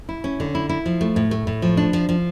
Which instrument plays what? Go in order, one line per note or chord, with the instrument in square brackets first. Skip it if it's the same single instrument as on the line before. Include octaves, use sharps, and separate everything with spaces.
[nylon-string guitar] E4
C#4
D3
E4
E4
F3
A3
A2
A3
A2
F3
D4
F3
F3